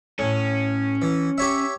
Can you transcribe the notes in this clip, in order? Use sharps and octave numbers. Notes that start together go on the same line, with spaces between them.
A2 C#4
E3
G4 C#5 E5